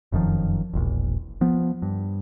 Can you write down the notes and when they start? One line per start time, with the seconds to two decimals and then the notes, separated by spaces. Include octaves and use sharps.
0.12 F1 F#2 D#3 F3
0.73 E1 A#1
1.41 F3 B3
1.82 G2